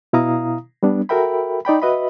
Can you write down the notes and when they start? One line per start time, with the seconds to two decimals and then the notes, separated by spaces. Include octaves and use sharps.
0.13 B2 E4 F5 A#5 D#6
0.83 G3 B3 D4
1.09 F#4 A4 A#4 E5 G5 B5
1.65 D#4 D5 G5 B5
1.82 F#4 B4 D#5 E5 B5